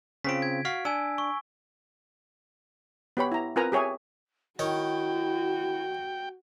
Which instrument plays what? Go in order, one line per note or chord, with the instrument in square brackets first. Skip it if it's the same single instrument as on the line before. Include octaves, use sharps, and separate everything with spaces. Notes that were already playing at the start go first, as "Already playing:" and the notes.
[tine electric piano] C#3 C4 F4 [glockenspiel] B6 D7
[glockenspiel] G#6
[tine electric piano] F#4 F5 B6
[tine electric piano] D4 [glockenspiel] G#5 E6
[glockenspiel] C#6
[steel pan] B3 G4 C#5 B5
E4 A#5
C4 F4 A#4 B4 G#5 A#5
G4 G#4 C#5 E5 G#5
[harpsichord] D#3 C#5 [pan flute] E4 [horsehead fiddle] F#4 [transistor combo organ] G5